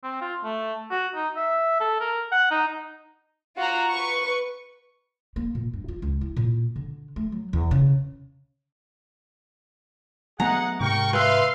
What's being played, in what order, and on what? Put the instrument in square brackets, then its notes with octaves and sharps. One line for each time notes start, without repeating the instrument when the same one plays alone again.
[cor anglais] C4
F4
A3
F#4
D#4
E5
A4
A#4
F#5
D#4
[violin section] F4 F#4 A#5
B4 C#6
[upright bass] A#3
A#2
G2
F4
C#2
E4
A#2
D3
A3
F#3
E2
C#3
[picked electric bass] F#3 A3 B3 [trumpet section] D#4 G#4 F#5 [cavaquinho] A#5
[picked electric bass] G#2 C3 [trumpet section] A#4 G5 C#6
[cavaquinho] B4 E5 [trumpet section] F5 C6